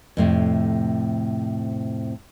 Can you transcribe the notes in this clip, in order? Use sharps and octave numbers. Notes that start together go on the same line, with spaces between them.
F2 A2 C3